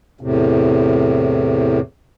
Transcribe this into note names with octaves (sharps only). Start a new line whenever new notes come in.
E2 A2 C3